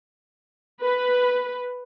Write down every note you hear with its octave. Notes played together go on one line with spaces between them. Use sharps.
B4